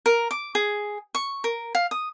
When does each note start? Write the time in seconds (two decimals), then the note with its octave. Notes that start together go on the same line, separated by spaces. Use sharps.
0.06 A#4
0.31 D6
0.55 G#4
1.15 C#6
1.44 A#4
1.75 F5
1.91 D#6